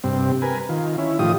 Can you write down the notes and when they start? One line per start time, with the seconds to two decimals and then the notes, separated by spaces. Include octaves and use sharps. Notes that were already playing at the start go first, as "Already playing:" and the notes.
0.04 G2 C3 C4
0.42 A#4 B4 G#5
0.69 D#3 F4
0.98 C#4 E4
1.19 A2 D#3 F3 F4 G4 D#6